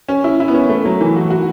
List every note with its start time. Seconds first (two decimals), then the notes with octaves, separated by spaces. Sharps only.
0.09 C#4
0.24 E4
0.40 E4
0.48 B3
0.54 C#4
0.69 A3
0.85 F#3
1.01 E3
1.16 F#4
1.30 F#4